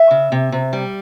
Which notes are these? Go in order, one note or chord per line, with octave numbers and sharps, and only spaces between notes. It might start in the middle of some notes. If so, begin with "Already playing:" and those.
Already playing: E5
C#3
C3
C3
G3